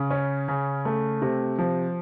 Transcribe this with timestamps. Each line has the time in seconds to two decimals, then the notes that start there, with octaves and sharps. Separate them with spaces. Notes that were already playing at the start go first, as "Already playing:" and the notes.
Already playing: C#3
0.10 C#4
0.48 C#3
0.85 A3
1.22 C3
1.58 F3